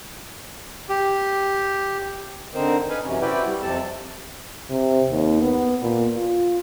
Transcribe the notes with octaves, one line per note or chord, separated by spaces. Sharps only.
G4
D3 C4 D#4 A#4 C5
D#4 B4 F5 G#5
F#2 C3 E3 C#4
C4 E4 F#4 B4 D5 G5
G3
F2 C3 C4 A4 A5
C3
D#2
B3
A#2
F4